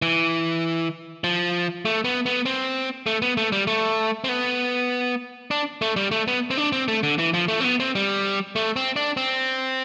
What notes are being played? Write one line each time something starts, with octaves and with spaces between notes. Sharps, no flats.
E3
F3
A3
B3
B3
C4
A3
B3
A3
G3
A3
C4
B3
D4
A3
G3
A3
B3
C4
D4
C4
A3
D3
E3
F3
A3
C4
B3
C4
G3
A3
C4
D4
C4